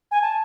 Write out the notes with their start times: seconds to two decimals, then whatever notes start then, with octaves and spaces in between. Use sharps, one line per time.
0.11 G#5
0.22 A5